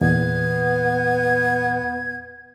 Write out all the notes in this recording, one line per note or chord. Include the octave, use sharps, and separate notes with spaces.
E2 A#2 B3 G#6